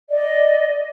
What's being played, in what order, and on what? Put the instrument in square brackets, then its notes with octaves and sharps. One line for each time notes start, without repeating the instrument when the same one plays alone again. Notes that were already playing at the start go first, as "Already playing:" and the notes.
[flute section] D5 D#5